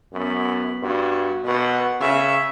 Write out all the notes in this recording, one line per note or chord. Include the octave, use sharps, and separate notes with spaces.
F#2 B3 B5
G2 F#4
B2 B4 F#5
C#3 E5